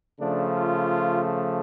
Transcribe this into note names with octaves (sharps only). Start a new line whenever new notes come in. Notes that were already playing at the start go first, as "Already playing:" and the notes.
C#3 F3 A3 D4
F4